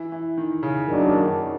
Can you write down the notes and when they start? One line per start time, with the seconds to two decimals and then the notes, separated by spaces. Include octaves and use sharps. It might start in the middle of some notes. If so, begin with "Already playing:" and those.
Already playing: E3
0.12 E3
0.38 D#3
0.63 C#3
0.88 F#2 D#3 F#3 A#3 D4